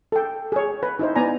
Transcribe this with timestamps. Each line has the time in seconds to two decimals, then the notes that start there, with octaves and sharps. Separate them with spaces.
0.12 A4 G5
0.52 G#4 C#5
0.83 B4
0.99 D#4 E4 C5
1.16 B3 D5 G#5 A#5